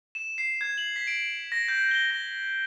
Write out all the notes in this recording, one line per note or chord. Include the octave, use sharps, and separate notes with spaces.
E7
C7
G#6
F#7
B6
D7
A#6
G6
G7
A#6